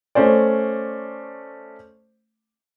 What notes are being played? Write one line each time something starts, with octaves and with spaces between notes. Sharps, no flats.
A3 C#4 C5 D5